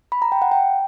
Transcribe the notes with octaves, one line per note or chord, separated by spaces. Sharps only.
B5
A#5
G5
F#5
G5